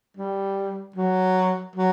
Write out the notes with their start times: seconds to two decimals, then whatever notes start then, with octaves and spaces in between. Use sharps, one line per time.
0.17 G3
0.96 F#3
1.76 F#3